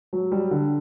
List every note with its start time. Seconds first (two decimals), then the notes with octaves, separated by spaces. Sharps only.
0.13 F#3
0.32 G3
0.51 D3